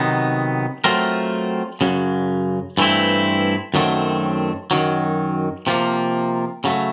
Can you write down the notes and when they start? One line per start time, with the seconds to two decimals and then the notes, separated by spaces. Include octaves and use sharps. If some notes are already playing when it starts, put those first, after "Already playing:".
Already playing: C3 D#3 F#3 B3 D#4
0.84 F#3 A3 C4 F4 A#4
1.81 F#2 C#3 F#3
2.78 G2 E3 A3 C4 E4
3.74 F#2 D#3 F#3 A3 C4
4.71 F#2 D#3 F#3
5.67 C3 F3 A#3
6.64 C#3 F#3 A3